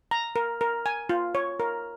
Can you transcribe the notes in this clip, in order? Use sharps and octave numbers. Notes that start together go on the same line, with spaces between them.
A#5
A#4
A#4
G#5
F4
C#5
A#4